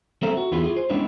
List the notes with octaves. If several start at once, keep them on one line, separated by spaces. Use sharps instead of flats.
C4 A4 A#4 E5
F#4
E2 B3 E4 F4 G#4
F4 G#4
C5
G#3 B3 C#4 D4 E4 C#5